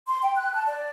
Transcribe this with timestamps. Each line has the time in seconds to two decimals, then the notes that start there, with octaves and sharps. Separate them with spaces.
0.07 C6
0.22 G5
0.36 F#6
0.54 A5
0.67 D5